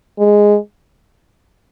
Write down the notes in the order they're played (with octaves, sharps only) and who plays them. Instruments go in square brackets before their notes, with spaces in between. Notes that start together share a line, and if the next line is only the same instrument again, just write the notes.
[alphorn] G#3